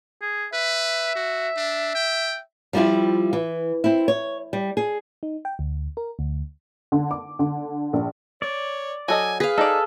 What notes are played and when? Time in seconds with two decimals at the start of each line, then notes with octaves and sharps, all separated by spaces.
0.21 G#4
0.53 B4 E5
1.15 F#4
1.56 D4
1.95 G5
2.73 F3 G3 C4 E4 F4
3.33 E3
3.84 C4 E4
4.08 C#5
4.53 G3
4.77 G#4
5.23 D#4
5.45 G5
5.59 D2
5.97 A#4
6.19 D2
6.92 D3
7.11 D6
7.39 D3
7.93 A#1
8.42 C#5 D5
9.08 F#3 A4 D#5 G#5
9.40 G#4 B4 F5
9.58 D#4 A4 D5